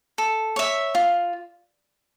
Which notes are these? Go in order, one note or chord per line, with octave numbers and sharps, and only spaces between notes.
A4
C#5 E5
F4